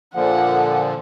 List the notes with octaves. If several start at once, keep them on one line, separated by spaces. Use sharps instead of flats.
A#2 D3 F3 F#5